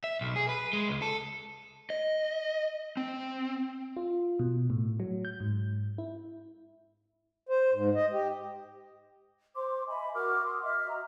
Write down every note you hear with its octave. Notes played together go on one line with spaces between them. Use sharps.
E5
B1
G#4
B4
G#3
C#2
A4
D#5
C4
F4
B2
A2
F#3
G6
G#2
E4
C5
G#2
D#5
G4
C5 C6 D6
D#5 E5 G#5 B5
F#4 A#4 D6 F6
F#5 C6 D#6
D#5 E5 D6 F6
F#4 A#5